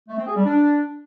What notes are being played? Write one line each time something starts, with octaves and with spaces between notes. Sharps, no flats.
A3
C4
G#4
G3
D4